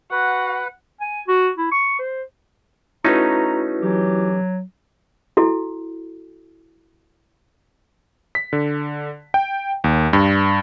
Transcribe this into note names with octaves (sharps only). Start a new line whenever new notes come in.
F#4 B4 F#5
G#5
F#4
E4
C#6
C5
A3 C#4 D#4 E4 F#4 B4 A#5
E3 F#3 G4
E4 F#4 A4
B6
D3
G5
D#2
G2